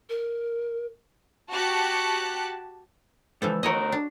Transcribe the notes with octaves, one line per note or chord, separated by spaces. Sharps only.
A#4
F#4 G4 A5 F#6 C#7
C#2 E3 F3 A4
D2 F#4 A#4 C#5 D#5
D4